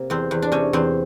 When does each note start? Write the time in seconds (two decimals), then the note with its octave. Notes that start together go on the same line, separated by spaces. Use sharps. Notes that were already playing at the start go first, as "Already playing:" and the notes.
Already playing: C3 A#3
0.10 E2 C4
0.31 E2
0.42 D4
0.52 C3 C#4
0.73 E2 C4